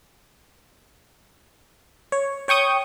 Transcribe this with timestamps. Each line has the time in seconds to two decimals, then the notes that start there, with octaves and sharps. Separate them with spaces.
2.12 C#5
2.48 C#5 G5 C#6 D#6 G6